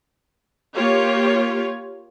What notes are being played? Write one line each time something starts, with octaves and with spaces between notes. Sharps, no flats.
A#3 F4 G4 C#5